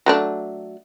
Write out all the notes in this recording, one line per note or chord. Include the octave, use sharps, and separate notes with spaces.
F#3 A3 D4